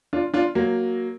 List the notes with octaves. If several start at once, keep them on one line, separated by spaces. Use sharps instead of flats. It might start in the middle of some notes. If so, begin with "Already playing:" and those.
D4 F4
D4 F4
F#3 A#3